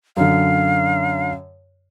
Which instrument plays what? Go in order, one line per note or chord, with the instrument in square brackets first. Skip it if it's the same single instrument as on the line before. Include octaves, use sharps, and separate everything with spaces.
[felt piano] F#2 D3 [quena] F5